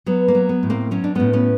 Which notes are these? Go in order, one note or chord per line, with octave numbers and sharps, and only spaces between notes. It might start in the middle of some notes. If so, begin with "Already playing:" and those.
F#3 B3
A#3
F#3
B3
A2
A#3 C4
F#3 C#4
D4
A2 B3 C#4
B3 C#4